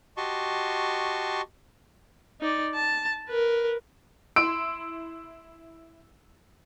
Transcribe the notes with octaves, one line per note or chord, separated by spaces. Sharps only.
F#4 G4 D#5 A5 C6 C#6
D#4 D5
A5
A#4 B4
E4 C6 E6 D7